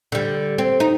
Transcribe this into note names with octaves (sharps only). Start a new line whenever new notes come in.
D3 G3
C4
D#4